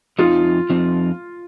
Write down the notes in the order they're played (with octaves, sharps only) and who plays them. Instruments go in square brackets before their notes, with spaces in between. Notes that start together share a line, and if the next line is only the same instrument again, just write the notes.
[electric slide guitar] F2 F3 C4 D#4 [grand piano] F4
[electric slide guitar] F2 F3 C4 D#4